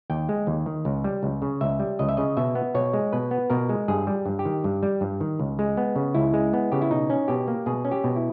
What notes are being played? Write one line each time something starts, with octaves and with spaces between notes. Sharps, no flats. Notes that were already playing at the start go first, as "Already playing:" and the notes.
D#2 G5
G#3
D#2
D#3
C#2
G3
C#2
C#3
C#2 E5
G3
C#2 D#5
E5
C#3 D#5
B2 E5
B3
B2 C#5
G#3
B2 B4
B3
B2 A#4
G#3
G2 G#4
G3
G2
G4
D#3
G2
G3
G2
D#3
C#2
G#3
B3
C#3
C#2 E4
G#3
B3
C#3 G4
E4
B2 D#4
C#4
B2 G4
A#3
B2 G#4
C#4
G4
B2
E4